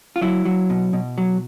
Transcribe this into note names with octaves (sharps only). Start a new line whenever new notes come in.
F4
F#3 E4
F#3
B2
B2
F#3